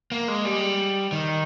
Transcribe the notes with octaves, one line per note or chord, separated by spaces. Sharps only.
A#3
G#3
G3
D#3